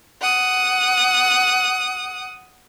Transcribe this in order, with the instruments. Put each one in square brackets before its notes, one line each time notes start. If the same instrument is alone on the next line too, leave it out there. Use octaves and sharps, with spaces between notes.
[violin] F#5 D#6